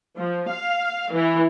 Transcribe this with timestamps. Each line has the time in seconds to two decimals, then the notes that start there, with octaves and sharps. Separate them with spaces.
0.18 F3
0.50 F5
1.12 E3